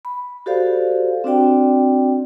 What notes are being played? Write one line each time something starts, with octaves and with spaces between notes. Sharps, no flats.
B5
F#4 G4 A4 C5 D5 F5
C4 D4 F#4 D5 G5